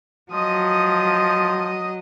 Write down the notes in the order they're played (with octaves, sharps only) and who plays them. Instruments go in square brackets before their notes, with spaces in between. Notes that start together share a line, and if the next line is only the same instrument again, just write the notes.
[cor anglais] F3 [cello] F#3 [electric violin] D#5 D#6